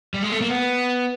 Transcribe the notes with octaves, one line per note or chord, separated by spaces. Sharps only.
G3
G#3
A3
A#3
B3